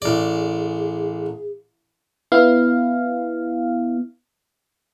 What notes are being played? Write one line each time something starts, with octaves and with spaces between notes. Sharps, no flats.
A1 G#4 D5
B3 E4 F5